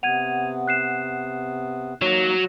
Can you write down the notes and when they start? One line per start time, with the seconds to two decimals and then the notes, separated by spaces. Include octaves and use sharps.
0.03 C3 B3 F#5 G#6 D#7 F7
0.68 F#6 C7 E7
2.02 F#3 A#3 D#4 C#5 A#6